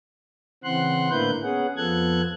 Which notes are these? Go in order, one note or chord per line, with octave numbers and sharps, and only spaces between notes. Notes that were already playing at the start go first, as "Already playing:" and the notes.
C#3 E3 C4 F#5 C6 F#6
A2 D3 A#3 E4 B4 G6
B3 C#4 G#4 F#5
F2 F3 B3 A4 F#6 G#6